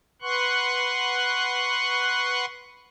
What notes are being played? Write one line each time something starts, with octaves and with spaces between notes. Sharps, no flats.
B4 F#5 C6 C#6 F#6